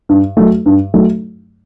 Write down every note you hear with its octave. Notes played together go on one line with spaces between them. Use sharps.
G2
F#3 A3
G2
F#3 A3